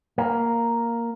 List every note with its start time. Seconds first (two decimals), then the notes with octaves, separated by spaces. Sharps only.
0.18 A#3